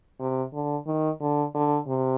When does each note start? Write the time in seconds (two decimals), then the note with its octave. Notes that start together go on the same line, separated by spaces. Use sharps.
0.20 C3
0.53 D3
0.87 D#3
1.20 D3
1.55 D3
1.87 C3